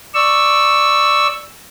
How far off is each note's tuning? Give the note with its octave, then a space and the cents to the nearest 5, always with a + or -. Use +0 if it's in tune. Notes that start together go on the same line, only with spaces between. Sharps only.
D5 +10 C#6 +0 E6 +0